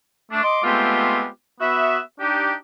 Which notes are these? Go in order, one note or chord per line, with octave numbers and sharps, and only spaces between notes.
A3 D4
D#5 C6 D6
G#3 A3 B3 C4 F4 G4
B3 F#4 E5
D4 D#4 G4